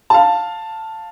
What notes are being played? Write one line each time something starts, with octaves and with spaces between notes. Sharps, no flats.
F5 A5